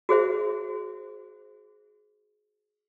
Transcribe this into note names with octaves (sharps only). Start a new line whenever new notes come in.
F#4 G#4 C5 E5